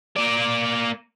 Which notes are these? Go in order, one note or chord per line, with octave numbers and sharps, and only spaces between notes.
A#3 D5